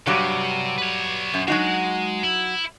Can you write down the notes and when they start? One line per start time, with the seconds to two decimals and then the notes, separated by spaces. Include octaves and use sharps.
0.07 G2 C3 F#3 G3
0.78 B4 C#5
1.34 F#2
1.48 F#3 G#3 D#4 F#4
2.23 E4